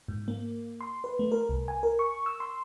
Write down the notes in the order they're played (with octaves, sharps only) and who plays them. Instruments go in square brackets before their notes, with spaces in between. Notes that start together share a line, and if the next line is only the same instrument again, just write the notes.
[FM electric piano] G#2
A#3
C6
B4
A3
A#4
C2
G#5
A#4
C#6
E6
C6